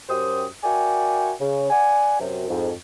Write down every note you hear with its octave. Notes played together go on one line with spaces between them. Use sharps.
F#2 G4 C5 D#6
F#4 A#4 D5 E5 G5 G#5
C#3
D5 F#5 G#5
F#2 C3
F2 G#2